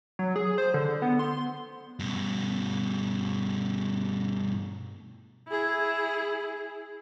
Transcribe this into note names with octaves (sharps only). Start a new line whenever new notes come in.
F#3
G#4
C5
D3
B3
C6
G2 B2
E4 G#4